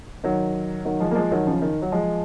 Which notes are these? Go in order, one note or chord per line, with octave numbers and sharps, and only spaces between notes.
D#3 F#3
D#3 F#3
F3 G#3
A#3
F3 G#3
D#3 F#3
C#3 F3
D#3
F#3
F3 G#3